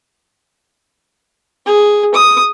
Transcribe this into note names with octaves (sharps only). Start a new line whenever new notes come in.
G#4
D#6